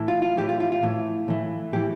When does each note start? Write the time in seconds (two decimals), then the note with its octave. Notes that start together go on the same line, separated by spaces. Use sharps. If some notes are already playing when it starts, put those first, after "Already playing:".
Already playing: A2 E3
0.08 F4
0.22 F4
0.37 A2 E3 G4
0.49 F4
0.60 F4
0.72 F4
0.83 A2 E3
1.28 A2 E3
1.73 A2 E3 G4